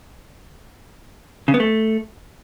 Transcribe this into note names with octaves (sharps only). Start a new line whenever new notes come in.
C#3
B3
A3